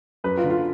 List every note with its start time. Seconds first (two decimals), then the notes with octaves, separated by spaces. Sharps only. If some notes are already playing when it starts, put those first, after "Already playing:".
0.24 F#2 B4
0.37 F4
0.44 D3
0.50 F4